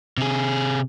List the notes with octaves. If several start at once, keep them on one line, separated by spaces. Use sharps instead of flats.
C3 G#4